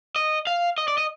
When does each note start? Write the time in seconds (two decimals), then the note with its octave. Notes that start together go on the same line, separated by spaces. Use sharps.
0.16 D#5
0.47 F5
0.78 D#5
0.88 D5
0.98 D#5